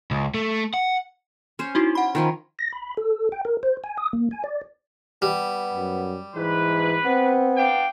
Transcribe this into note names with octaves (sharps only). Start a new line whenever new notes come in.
C#2
A3
F#5
C#4 C5
D#4 E4 F#4
F#5 B5
D#3 F3 C#4
A#6
B5
A4
G5
A#4
C5
G#5
D#6
A#3
G#5
D5
G3 B3
F#2
G#2 E3 B4
B3 C4
D4 F5 G5